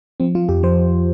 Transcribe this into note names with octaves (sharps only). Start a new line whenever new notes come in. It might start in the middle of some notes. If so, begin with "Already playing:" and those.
F3 C4
F3 F4
F2 G4
F3 C5